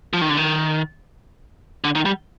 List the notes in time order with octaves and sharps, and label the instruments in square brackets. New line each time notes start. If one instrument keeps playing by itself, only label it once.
[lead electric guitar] F3
D#3
D3
D#3
D3
D#3
G3